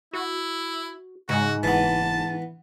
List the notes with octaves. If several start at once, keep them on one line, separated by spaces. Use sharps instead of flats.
E4 F#4
G#2 C#3 F#4
F#1 E3 B3 A5